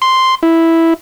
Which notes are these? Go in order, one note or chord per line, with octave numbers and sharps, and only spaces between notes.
C6
E4